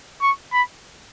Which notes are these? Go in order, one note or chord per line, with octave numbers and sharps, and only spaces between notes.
C#6
B5